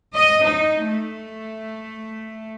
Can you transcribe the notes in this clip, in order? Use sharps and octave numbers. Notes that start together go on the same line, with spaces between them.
D#5
D#4
A3